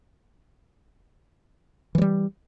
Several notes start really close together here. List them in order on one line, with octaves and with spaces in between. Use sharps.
E3 F#3 G3